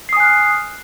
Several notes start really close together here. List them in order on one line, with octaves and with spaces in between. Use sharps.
C7 D#6 G#5 F#6 F6